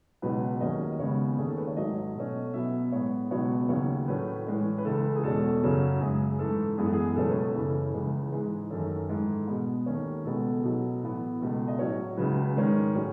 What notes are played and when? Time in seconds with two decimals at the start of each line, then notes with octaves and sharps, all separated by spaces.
0.22 C#2 B2 F#3 B3 B4
0.61 D#2 D#3 F#3 C#4 D#5
0.99 D#2 C#3 G#3 B3 C#5
1.38 D#2 D#3 A3 C#4 G#4
1.48 A4
1.57 B4
1.67 C#5
1.77 G#2 F#3 A3 D#5
2.15 B2 A3 C#4
2.54 B2 F#3 B3 E5
2.92 A2 G#3 B3 C#5
3.31 C#2 B2 F#3 B3 C#5
3.69 D#2 C#3 F#3 C#4 C#5
4.08 A2 F#3 A3 C#4 B4
4.47 A2 E3 G#3 C#4
4.78 B4
4.85 C#2 C#3 E3 A4
5.16 G#4
5.24 E2 B2 G#3 C#4 A4
5.62 F#2 C#3 F#3 C#4
6.00 F#2 C#3 G#3 G#4
6.39 G#2 E3 A3 A4
6.78 F#2 E3 G#3 B3 G#4
6.86 A4
6.93 G#4
7.16 C#2 B2 F#3 A3 C#4 A4
7.28 B4
7.40 A4
7.55 F#2 C#3 E3 A3 C#4
7.94 C#2 C#3 E3 G#3
8.32 G#2 E3 G#3
8.70 F#2 D#3 A3 C#4 A4
9.09 G#2 E3 A3 G#4
9.48 B2 G#3 B3
9.86 D#2 D#3 A3 C#4
10.25 C#2 B2 G#3 B3 A4
10.64 B2 F#3 B3
11.02 A2 E3 B3
11.41 C#2 B2 A3
11.68 D#5
11.79 A2 F#3 C#4 C#5
12.17 C#2 C#3 F#3 B4
12.56 G#2 D#3 G#3 C#4
12.94 A2 F#3 C#4